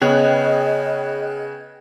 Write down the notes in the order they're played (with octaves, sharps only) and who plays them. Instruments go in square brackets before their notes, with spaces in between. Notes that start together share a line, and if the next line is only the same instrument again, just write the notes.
[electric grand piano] C#3 B3 [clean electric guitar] G#4 C#5 [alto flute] D#5 [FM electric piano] G5 F#6 G#6